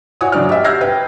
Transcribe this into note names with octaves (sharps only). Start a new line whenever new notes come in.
E4 F#4 C#5 G#5 D#6
F#1 F#3 D5 F6
G4 E5
E6 F6 G6 G#6 A#6 C7
B4 G5